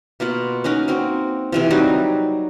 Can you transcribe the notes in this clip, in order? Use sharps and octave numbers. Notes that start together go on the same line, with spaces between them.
B2 A#3 F4 F#5
C#4 D#4 F#4 A#4
A#3 C4 F#4
C3 E3 F3
F#3 G3 D#4 F#4